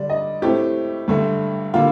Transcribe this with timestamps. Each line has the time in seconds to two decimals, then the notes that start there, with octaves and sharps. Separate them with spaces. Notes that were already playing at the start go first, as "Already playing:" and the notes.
Already playing: D3 G3 D4 D5
0.10 D#5
0.42 A2 A3 C4 G4
1.08 G2 D3 A3
1.74 D3 G3 A#3 F4